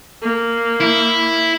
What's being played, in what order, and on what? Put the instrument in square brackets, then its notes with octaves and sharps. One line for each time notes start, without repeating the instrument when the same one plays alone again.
[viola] A#3
[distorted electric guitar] E4